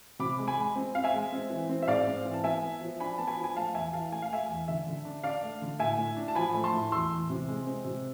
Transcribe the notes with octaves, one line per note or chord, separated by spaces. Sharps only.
C3 B5 D6
G#3
G#5 B5
G#3
C4
C4 F5
E5 G#5
G#3
C4
E3
C4
E5
G#2 D5 F5
C4
E3
A5
B3 E5 G#5
B3
F3
D4 G#5 B5
B3 A5
G#5 B5
F3
G#5
A3 F5 A5
E2 E5 G#5
E3 F5 A5
A3 G#5
F5
A3 E5 G#5
E2
D3 E5
D3
D4
D4 D5 F5
A3
D3
A2 E5 G#5
A2
D4
A5
F3 G#5 B5
A3 B5
A5 C6
A2
E2 C6 E6
E2
C3
G#3
C4
C3